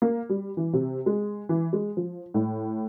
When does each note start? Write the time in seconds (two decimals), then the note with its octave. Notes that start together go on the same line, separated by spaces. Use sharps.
0.02 A#3
0.29 G3
0.57 E3
0.73 C3
1.06 G#3
1.49 E3
1.73 G#3
1.97 F3
2.34 A2